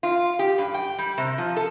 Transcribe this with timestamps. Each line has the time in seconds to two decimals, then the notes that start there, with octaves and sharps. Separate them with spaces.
0.03 F4
0.39 G4
0.58 G2
0.74 G5
0.98 G3
1.18 C3
1.38 F3
1.57 A4